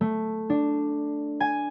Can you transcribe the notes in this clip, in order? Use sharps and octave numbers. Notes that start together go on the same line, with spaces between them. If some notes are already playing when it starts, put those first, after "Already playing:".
A3
D4
G#5